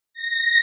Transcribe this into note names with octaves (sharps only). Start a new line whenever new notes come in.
A#6